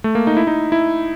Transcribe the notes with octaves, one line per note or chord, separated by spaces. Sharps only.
A3
A#3
D#4
E4
D#4
E4